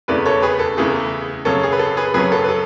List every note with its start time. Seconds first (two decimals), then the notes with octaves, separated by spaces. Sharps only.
0.08 E2 C#3 E3 A3 B4 D5
0.26 A4 C#5
0.42 G#4 B4
0.59 A4
0.77 E2 C#3 E3 A3 G#4
1.45 F#2 C#3 F#3 C#4 A4
1.63 G#4
1.72 B4
1.79 A4
1.97 G#4 B4
2.14 F#2 C#3 F#3 C#4 G#4 B4
2.32 A4
2.44 B4
2.49 A4